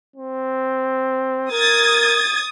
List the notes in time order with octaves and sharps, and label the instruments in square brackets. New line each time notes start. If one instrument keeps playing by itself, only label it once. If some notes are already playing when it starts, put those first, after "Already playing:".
[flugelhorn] C4
[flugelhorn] A#4 [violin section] D#6 G#6 A6